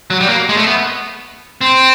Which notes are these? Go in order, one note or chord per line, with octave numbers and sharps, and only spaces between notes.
F#3
G3
A#3
G#3
A3
B3
C4